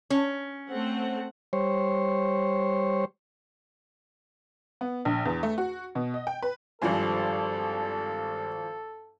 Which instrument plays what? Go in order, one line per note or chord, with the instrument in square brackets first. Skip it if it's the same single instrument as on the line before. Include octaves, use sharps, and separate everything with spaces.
[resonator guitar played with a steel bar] C#4
[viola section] A3 C4 F#5
[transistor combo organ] G3 C5 C#5
[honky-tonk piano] B3
A#1
E2
A3
F#4
B2
D#5
G5
B4
[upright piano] G#1 F3 C5 [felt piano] G2 G#5 [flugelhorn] A4